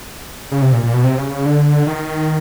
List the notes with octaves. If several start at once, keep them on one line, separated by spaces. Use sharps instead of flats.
C#3
C3
A#2
A#2
B2
C3
C#3
C#3
D3
D#3